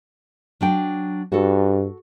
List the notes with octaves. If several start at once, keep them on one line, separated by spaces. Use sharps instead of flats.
F#3 D4 G5
G2 F#4 A4